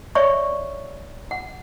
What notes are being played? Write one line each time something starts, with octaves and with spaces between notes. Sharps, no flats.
C#5 D5 E5 C#6
F#5